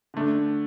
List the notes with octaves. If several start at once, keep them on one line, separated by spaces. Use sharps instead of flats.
D3 A3 D4